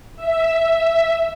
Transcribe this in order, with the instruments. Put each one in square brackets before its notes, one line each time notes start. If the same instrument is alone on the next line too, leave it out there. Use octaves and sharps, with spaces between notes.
[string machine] E5